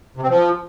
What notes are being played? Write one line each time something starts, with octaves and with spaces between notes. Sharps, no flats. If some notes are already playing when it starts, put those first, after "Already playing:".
C3
C4
F3